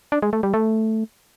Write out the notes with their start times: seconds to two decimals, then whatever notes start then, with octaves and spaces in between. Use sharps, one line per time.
0.12 D4
0.22 G#3
0.33 A3
0.43 G3
0.54 A3